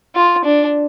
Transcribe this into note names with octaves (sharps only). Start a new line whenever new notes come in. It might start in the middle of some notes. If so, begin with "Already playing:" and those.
F4
D4